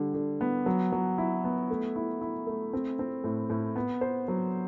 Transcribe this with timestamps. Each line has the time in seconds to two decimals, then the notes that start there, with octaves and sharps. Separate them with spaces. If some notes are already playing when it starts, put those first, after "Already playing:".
Already playing: D3 G3
0.14 D3
0.41 B3
0.66 F#3
0.92 F#3
1.18 E4
1.44 B3
1.70 A3
1.96 E4
2.21 E4
2.47 A3
2.73 C4
2.99 C4
3.24 A2
3.50 A2
3.76 B3
4.01 C5
4.28 F#3